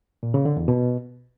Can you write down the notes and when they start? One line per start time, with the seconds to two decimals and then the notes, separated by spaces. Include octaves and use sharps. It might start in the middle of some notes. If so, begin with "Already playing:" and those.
0.23 A#2
0.34 C#3
0.45 D3
0.57 E2
0.68 B2